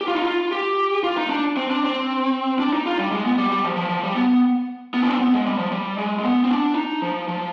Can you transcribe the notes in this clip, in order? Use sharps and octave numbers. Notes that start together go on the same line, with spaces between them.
G4
F4
D#4
F4
G4
F4
D#4
D4
C4
D4
C4
D4
D#4
F4
G3
G#3
B3
G3
G3
F3
F3
F3
G3
B3
B3
D4
C4
B3
G#3
G3
F3
G3
G#3
G#3
B3
C4
D4
D#4
F3
F3